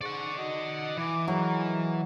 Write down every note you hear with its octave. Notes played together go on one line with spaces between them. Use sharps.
G#2 D5 F#5 C#6
D#4 F#4 D#5
E3 D6
F#3 G#3 A#3